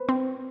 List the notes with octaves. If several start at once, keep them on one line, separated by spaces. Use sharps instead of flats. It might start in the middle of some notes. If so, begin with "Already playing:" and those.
Already playing: B4 C5
C4